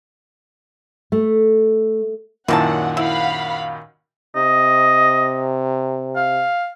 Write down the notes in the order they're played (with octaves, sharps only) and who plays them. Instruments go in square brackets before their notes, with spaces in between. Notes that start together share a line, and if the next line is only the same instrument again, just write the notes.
[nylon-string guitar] A3
[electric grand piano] F#2 A#2 D#3 [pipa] E3 F#3 A5 [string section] F#5
[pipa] E4 [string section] F5 F#5 B5
[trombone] C3 [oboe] D#5
[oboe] F5